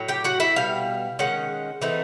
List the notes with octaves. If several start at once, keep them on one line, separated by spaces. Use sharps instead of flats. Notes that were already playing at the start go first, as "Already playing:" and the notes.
Already playing: A2 F#3
G4 G5
F#4 F#5
E4 E5
B2 G3 F5
D#3 G#3 C#4 F#5
E3 A3 C4 D#4